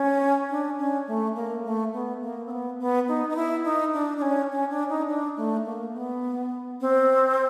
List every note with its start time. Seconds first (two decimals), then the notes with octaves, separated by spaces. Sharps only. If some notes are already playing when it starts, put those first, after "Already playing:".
Already playing: C#4
0.50 D4
0.78 C#4
1.08 A3
1.35 A#3
1.64 A3
1.93 B3
2.22 A#3
2.46 C4
2.51 B3
2.80 B3
3.08 D#4
3.29 D#4
3.36 E4
3.65 D#4
3.94 D4
4.17 D4
4.22 C#4
4.51 C#4
4.70 D4
4.89 D#4
5.08 D4
5.37 A3
5.66 A#3
5.94 B3
6.81 C4